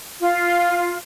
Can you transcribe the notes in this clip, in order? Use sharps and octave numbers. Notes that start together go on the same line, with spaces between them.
F4